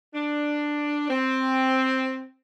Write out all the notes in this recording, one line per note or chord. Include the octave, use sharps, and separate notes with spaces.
D4
C4